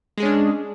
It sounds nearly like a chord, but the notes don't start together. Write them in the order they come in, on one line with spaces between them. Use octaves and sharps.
G#3 G#4 C#4 D4